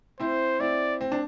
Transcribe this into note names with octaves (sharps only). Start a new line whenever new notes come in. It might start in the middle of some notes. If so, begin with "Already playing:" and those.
C4 E4 C5
C4 E4 D5
C4
D4